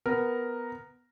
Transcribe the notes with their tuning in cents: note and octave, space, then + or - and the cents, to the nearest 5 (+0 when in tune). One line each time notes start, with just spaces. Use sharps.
B3 +5 A#4 +0